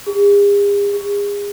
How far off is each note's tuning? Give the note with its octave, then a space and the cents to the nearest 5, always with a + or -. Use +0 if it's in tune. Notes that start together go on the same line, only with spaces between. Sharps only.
G#4 -45
G#4 -35